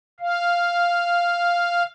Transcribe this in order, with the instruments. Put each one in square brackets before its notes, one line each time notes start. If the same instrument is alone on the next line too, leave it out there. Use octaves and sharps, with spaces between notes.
[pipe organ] F5